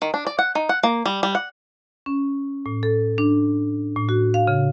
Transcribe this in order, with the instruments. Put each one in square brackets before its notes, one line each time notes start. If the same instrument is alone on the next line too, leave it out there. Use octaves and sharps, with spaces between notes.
[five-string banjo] D#3
D4
D5
F#5
D#4
F#5
A#3
G3
G3
F#5
[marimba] C#4
A2
A4
D4
A2
F#4
F5
C#3